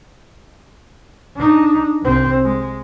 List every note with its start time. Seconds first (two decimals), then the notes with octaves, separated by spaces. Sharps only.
1.36 D4 D#4
2.03 C2 C4
2.44 G#3